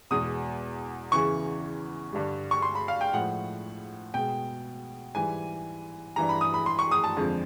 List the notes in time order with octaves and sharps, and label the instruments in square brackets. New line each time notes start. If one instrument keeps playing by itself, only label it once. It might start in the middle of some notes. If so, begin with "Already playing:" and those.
[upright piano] E2 B2 G#3 D#6
E2 C#3 E3 C#6
G2 D3 G3
C#6
C6
B5
F5
G5
A2 F3 G#3 F#5
B2 G#3 G5
G#2 E3 G3 G#5
G2 E3 G3 A#5
B5
D#6
B5
C6
C#6
D#6
A5
F2 D3 F3 G#3